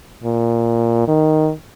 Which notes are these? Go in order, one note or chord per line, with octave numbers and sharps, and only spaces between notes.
A#2
D#3